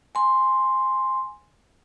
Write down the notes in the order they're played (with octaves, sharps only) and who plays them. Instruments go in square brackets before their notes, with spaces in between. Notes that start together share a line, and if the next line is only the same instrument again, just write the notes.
[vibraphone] G#5 C6